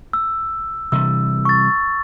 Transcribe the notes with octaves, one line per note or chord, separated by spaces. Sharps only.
E6
C3 E3 G3 E6
C#6 A6